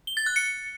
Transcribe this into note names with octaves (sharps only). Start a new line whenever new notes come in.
G7
A6
F#6
C#7